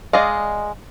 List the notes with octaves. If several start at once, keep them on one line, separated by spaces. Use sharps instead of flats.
G#3 D5 D#5 F5